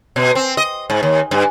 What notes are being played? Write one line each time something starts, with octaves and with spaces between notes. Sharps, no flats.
B2
C4
D#5
G#2
D#2
G2